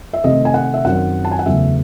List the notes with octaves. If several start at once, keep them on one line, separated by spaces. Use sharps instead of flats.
E5
C3 D#3 A3 C4 D#5
G#5
F#5
E5
F#2 D#3 F#3 C4 F#5
A5
G#5
F#5
E2 C#3 F#3 A3 E5